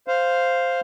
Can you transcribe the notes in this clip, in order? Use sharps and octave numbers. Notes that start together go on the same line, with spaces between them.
C5 F5